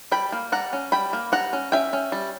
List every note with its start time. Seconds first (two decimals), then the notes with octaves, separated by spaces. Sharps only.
0.12 G3 G5 B5
0.32 A#3
0.52 G3 F#5 A#5
0.73 C#4
0.92 G3 G5 B5
1.13 A#3
1.32 G3 F#5 A#5
1.53 C#4
1.72 C#4 E5 G5
1.93 C#4
2.12 G3